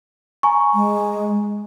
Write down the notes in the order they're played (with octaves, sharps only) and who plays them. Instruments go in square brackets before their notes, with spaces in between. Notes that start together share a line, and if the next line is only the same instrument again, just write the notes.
[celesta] G#5 A#5 C#6
[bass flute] G#3